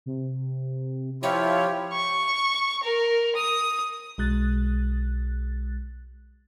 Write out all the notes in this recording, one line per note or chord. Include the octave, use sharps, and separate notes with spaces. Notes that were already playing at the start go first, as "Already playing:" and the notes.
C3
F3 E4 F4 G4 C#5
C#6
A#4
D#6
B1 G#3 F#6 A6